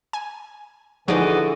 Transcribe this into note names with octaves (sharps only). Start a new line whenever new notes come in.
G#5
D3 E3 F3 D#4 F#4 G#4 D5 D#5